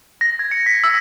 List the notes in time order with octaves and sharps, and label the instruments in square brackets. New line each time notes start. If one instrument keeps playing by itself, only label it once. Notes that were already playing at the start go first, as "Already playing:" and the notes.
[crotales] A#6
G#6
C#7
B6
E6